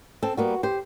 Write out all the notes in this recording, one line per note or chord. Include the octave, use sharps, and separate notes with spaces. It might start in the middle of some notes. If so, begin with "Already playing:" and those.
C4 A4
G3 A#3 B3 F#4
G4 C5